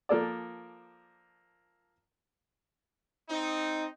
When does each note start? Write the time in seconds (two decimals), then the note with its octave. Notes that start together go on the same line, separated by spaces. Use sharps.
0.09 F3 A#3 A4 D5
3.30 C4 D#4